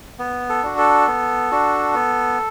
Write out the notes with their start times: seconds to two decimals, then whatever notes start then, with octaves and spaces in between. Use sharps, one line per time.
0.19 B3
0.49 A4
0.63 D4 F#4
0.78 A4
1.07 B3
1.52 D4 F#4
1.94 B3